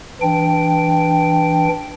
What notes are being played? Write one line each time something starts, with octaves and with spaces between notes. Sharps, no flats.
E3 D4 G5